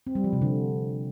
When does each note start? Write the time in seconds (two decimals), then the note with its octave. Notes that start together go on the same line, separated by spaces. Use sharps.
0.07 C4
0.15 G3
0.24 F3
0.33 C3
0.42 D3